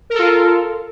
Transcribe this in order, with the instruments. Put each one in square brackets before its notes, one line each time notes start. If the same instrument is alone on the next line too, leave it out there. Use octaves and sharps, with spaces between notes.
[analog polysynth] A#4
A4
F4